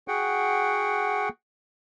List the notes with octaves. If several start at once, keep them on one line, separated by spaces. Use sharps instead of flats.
F#4 G#4 F#5 G5